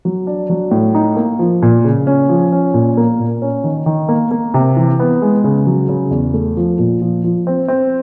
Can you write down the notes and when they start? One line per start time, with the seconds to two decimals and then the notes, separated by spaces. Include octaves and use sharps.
0.05 F#3
0.27 D4
0.50 F#3
0.71 A2
0.95 D#4
1.16 A#3
1.39 F3
1.62 A#2
1.84 C#3
2.07 C#4
2.29 F3
2.52 C#4
2.74 A#2
2.97 A#3
3.20 A#2
3.42 C#4
3.64 D#3
3.86 D#3
4.09 A#3
4.31 A#3
4.54 C3
4.77 E3
4.99 B3
5.22 G#3
5.44 C#3
5.67 F#3
5.89 C#3
6.11 E2
6.34 A3
6.57 F3
6.79 A#2
7.02 F3
7.24 F3
7.47 C4
7.68 C4